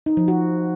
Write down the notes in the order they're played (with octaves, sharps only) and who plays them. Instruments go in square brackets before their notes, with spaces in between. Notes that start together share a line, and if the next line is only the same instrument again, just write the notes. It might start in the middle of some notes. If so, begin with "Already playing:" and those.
[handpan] D#4
F3
F#4